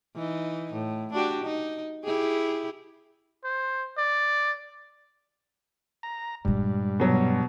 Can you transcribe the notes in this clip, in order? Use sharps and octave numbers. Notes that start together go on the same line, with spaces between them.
E3 D#4
A2
D4 F#4 G4
D#4
E4 G4 G#4
C5
D5
A#5
G2 A#2 G3 G#3
B2 F#3